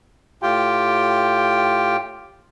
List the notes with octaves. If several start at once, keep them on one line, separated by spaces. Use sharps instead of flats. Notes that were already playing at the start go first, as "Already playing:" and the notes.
A2 F4 G4 G5